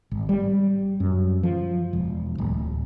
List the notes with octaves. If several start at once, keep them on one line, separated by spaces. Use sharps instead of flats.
G#1
G3
F#2
F3
E1
D1